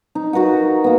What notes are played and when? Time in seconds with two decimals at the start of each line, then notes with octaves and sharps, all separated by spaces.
0.15 D#4
0.33 F#4 A#4 B4 F#5
0.84 A#3 B3